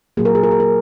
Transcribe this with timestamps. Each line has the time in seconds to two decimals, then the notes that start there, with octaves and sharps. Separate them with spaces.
0.17 A#2 F#3 A#3 G#4
0.25 A#4
0.35 G#4
0.43 A#4
0.51 G#4
0.60 A#4